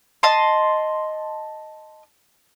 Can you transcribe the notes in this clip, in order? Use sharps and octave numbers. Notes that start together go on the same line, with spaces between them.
D#5 A5 C6